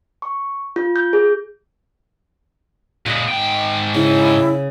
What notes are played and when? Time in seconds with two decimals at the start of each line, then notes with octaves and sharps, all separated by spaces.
0.22 C#6
0.76 F4
0.96 G6
1.13 G#4
3.06 A#2 G#3 F#5 A#5 B5
3.28 G#2 G5
3.94 C#3 E4